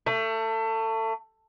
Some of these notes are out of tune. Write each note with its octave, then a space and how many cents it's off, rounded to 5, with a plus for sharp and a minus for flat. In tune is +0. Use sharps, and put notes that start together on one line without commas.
A3 +25